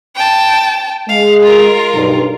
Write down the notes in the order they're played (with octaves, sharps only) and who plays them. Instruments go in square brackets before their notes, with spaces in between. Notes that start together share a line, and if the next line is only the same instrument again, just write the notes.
[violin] G5 A5
[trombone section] G#3 [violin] F5
[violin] F4 A#4
[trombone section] B1 G2